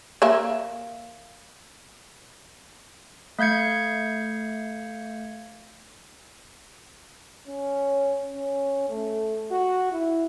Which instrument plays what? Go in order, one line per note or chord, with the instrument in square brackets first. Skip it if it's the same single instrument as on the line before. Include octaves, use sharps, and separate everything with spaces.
[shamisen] A#3 E5
[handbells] A3 F5 G6 G#6 C#7
[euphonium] C#4
C#4
A3
F#4
E4